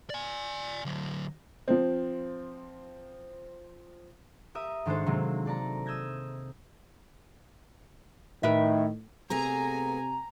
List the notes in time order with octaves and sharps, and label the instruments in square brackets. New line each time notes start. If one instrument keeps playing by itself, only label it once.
[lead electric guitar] D5 G#5
D3 F#3
[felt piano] F3 C4
[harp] G4 A#4 E5 D#6
G#2 D#3 G#3 D4 A4 C5
C3 D#3 F#3 G#3 A#3 C4
A4 D5 A5 A#5
D#6 E6 G6 G#6 A#6
[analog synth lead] A2 [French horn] D#3 [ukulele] A#4 B4 E5
[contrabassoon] C3 [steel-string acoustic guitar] A3 B3 G#4 [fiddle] G#5 [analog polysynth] A#5